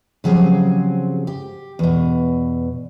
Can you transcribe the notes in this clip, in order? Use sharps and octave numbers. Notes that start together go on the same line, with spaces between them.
C#3 F3 F#3 C4 G4 G#4
G4
E2 B2